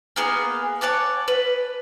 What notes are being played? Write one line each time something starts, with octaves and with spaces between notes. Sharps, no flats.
A#3 B3 G#4
C#5 F#5 A5 D6
B4